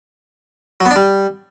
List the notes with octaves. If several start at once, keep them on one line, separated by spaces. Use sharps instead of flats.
F#3
B3
D4
G3